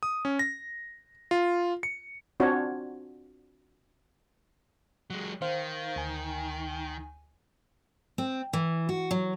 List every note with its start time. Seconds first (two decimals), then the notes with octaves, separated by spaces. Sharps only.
0.03 D#6
0.25 C#4
0.39 A#6
1.31 F4
1.83 C#7
2.40 C4 D4 F4 F#4 C#5
5.10 F#3 G#3
5.42 D#3 C5 F5
5.96 D2 G#5
8.18 C4
8.53 E3
8.89 F#4
9.11 F#3